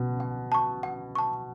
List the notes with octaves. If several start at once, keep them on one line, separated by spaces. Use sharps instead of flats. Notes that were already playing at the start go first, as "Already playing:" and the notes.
Already playing: B2
F#5
A5 C#6
F#5
A5 C#6